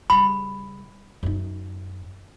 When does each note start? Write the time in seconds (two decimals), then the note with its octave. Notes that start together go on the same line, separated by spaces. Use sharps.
0.10 C#3 G3 B5
1.23 F#2 D#4